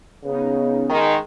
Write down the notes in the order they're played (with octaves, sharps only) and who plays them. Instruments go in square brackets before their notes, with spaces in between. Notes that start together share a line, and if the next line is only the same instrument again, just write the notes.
[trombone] C#3 [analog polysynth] B3 C#4 D#4
[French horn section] D#3 G#3